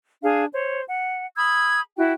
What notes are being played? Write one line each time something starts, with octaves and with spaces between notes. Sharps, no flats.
D4 G#4 F5
C5 C#5
F#5
B5 D#6 E6 G#6
E4 F#4 G5